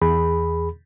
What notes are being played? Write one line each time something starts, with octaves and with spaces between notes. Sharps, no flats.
E2 G#4 B5